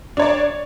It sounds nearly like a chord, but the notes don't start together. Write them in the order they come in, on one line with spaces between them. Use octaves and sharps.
D4 C#5 D5